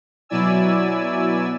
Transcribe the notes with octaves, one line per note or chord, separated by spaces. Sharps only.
B2 F#3 E4 D5 G#5 E6